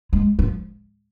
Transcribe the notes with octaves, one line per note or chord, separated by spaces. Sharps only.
G#3
F3